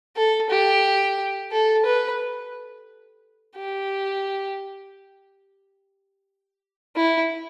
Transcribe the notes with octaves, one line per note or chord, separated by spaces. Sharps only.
A4
G4
A4
B4
G4
E4